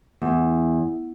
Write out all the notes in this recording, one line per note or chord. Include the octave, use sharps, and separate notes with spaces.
E2